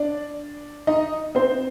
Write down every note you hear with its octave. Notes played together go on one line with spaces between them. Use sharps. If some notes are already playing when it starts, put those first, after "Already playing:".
Already playing: D4 D5
D#4 D#5
C4 C5